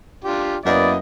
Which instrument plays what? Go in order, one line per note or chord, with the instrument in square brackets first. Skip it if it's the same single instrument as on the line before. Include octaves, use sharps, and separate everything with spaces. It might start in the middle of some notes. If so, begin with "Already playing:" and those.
[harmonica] D4 F4 G4
[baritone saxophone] F#2 [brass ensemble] A#3 D#5 [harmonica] B3 E4 [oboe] D5